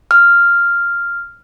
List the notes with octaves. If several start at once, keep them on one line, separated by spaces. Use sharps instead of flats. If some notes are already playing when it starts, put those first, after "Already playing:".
F6